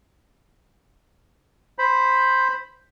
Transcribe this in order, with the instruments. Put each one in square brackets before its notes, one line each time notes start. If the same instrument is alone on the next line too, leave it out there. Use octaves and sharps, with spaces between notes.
[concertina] C5 B5